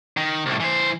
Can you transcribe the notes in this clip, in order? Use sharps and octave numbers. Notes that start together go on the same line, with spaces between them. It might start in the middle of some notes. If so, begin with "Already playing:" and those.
D#3
C2 A2
E3 C5